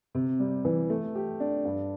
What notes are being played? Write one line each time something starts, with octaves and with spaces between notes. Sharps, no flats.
C3
G3
E3
A3
G4
D4
G2